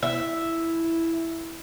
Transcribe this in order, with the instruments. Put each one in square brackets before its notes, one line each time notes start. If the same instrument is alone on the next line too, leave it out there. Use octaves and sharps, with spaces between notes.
[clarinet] E4 [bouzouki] E5